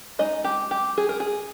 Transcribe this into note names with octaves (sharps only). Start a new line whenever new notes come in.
G#3 D#4 D#5
G4
G4
G#4
A#4
G#4